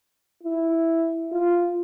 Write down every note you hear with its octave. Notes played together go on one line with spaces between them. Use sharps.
E4
F4